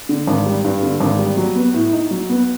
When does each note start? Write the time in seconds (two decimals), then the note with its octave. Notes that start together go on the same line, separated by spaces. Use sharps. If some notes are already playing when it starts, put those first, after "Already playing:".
0.09 D3
0.27 G#1
0.46 G3
0.64 G2
0.83 D3
1.00 G#1
1.19 G3
1.37 F#3
1.55 B3
1.74 A2
1.93 D#4
2.11 F#3
2.29 B3